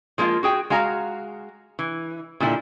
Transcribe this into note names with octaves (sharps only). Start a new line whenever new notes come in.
F3 G#3 A#3 D#4 F4
F#4 G#4 G5
G#3 F#4 F5 A#5
E3
A#2 D3 G3 E4